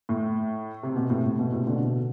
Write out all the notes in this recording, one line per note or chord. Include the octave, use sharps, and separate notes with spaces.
A2
C3
B2
A2 C3
A2
B2
A2 C3
B2 D3
B2